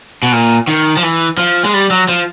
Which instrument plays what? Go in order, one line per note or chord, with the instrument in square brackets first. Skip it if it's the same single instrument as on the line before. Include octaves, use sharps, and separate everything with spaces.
[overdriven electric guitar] B2
A#2
D#3
F3
E3
F3
G#3
G3
F#3
F3